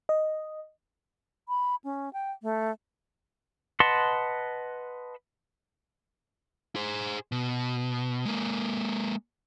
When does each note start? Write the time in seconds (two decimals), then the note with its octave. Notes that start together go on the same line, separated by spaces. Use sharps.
0.09 D#5
1.49 B5
1.84 C#4
2.13 G5
2.42 A3
3.80 B4 D#5 F#5 A5 C6
6.76 G#4 C5
7.32 B2
8.25 G#3 A#3